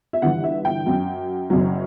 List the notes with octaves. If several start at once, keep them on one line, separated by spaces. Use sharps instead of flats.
E5
G1 G2 E3 F#5
E5
G5
F#2 F#3
F#1 F#2 F#3